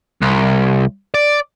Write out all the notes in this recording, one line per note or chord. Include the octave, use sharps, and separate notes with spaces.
C2
D5